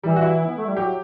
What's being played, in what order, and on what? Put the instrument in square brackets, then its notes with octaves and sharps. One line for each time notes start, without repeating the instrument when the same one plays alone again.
[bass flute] E3 [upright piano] G3
[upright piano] F#4
E4
[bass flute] B3
A3
G3
[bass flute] F#3 [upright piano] G4